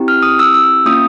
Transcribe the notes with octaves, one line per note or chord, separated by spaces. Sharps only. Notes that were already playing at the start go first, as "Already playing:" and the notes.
Already playing: C4 E4 G4
F6
D#6
E6
E6
A#3 C#4 F4 D#6